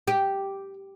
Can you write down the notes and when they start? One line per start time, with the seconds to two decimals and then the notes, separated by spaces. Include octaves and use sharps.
0.08 G4